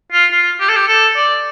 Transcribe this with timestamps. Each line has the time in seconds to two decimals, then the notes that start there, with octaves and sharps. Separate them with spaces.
0.12 F4
0.31 F4
0.60 G4
0.68 A4
0.76 G4
0.88 A4
1.16 D5